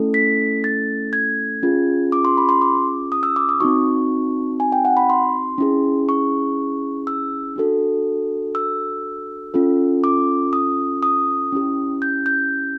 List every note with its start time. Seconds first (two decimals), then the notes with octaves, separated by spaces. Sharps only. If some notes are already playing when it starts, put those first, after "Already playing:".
Already playing: A3 C#4 E4 A4
0.14 B6
0.64 A6
1.13 G#6
1.63 C#4 F4 G#4
2.12 D6
2.25 C6
2.37 B5
2.49 C6
2.61 D6
3.12 D#6
3.23 E6
3.36 D6
3.49 D#6
3.60 C4 D#4 F#4 C#6
4.60 G#5
4.72 G5
4.85 F#5
4.97 B5
5.10 C6
5.58 C#4 E4 G#4
6.09 C#6
7.07 E6
7.56 D4 F#4 A4
8.55 E6
9.54 C#4 F4 A4
10.04 D6
10.53 D#6
11.03 D#6
11.52 C#4 E4 G4
12.02 G6
12.26 G6